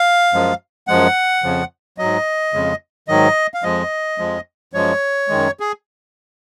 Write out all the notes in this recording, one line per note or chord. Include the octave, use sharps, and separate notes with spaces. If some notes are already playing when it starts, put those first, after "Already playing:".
Already playing: F5
F#2 F3 G#3
F#2 F3 G#3 F#5
F2 C#3 F3
G#2 F#3 D#5
F2 C#3 G#3
G#2 D#3 F#3 D#5
F5
F2 F3 G#3 D#5
F2 F3 G#3
F#2 F3 G#3 C#5
F#2 D#3 G#3
G#4